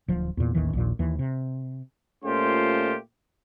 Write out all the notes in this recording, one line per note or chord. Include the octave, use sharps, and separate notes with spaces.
D1 F3
E2 A#2
A1 D#2 D#3 E3
A#1 D#2 A#2
D#2 E3
C3
A#2 A3 C#4 F4 G4 C5